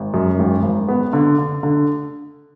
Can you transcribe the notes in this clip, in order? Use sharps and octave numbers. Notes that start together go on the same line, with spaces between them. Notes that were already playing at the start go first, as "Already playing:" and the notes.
Already playing: G#1
F#2
G#1
G#1
B3
D3
D3
D3